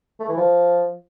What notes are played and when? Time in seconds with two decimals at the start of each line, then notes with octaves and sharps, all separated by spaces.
0.20 A3
0.29 E3
0.37 F3